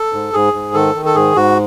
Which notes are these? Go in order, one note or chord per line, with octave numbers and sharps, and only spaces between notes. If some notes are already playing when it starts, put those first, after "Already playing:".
Already playing: A4
G#2
G#2 G#4
G#2
D#3 A4
D#3
A4
G#2 G#4
G#2 F#4